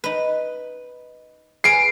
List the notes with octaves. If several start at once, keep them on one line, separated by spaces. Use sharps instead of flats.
D#4 B4
G#4 B4 F5 C7 D7